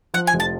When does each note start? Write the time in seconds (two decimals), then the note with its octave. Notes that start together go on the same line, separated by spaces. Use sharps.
0.14 F3 F#5
0.27 G#5
0.34 F1
0.40 A5